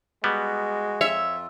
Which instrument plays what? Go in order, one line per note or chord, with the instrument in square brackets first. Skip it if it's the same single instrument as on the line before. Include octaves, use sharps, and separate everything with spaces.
[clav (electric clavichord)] G3 B3 [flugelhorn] G#3 [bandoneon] F#4
[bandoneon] F2 F4 [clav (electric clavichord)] C#5 [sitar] E5